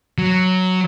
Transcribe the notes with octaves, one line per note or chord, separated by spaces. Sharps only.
F#3